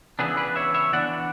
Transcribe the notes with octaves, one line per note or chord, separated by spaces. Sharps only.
C#3 E3 B3 D4 E4 G#4
B4 D5
C#5 E5
C#5 E5
E3 B3 D4 D5 F#5